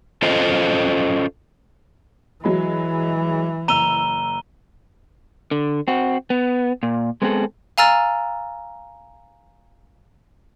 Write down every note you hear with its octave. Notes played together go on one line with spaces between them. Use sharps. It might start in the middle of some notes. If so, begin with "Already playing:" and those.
C#4 F4 A4 C5 D#5
E3 F#3 G#3 B5
F#1 A#5 E6 D#7 F7 G7
D3
C4 F#4
B3
A#2
G#3 B3 C4 D#4 G#4 A4
F5 G#5 A#5 E6 F6 A6